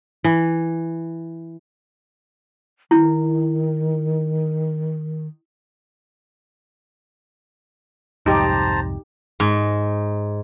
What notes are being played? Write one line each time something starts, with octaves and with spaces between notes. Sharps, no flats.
E3
D#3 E4
C2 F2 G#2 D#4 G4 C5 A5 A#5
G#2